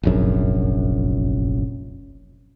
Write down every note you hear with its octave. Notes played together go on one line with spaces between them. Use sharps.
F1 A#1 F#2